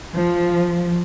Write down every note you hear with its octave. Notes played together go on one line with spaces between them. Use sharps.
F3